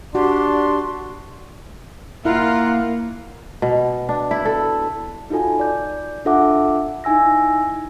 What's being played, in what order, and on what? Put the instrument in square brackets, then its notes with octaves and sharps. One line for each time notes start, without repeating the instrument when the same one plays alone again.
[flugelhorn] D4 [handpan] F#4 [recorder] G4 [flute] C6
[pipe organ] A#3 [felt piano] E4 [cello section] F4 [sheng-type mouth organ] A#4 F#5
[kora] B2
D4
E4
A4
[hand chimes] D#4 F4 F#4 A4 G#5
D5 G6
D4 F4 A4 E5 F#5 D6
D#4 E4 G#5 E6 A#6